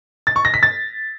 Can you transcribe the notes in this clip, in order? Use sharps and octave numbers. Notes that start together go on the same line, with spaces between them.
A6
C#6
A#6
B6
A6